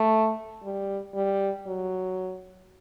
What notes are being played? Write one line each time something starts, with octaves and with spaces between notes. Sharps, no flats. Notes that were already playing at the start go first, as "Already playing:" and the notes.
Already playing: A3
G3
G3
F#3